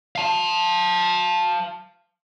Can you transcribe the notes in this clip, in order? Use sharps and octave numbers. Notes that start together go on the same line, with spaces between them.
F5 A5